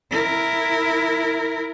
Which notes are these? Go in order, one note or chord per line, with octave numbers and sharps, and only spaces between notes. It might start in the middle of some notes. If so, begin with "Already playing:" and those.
E4 A#4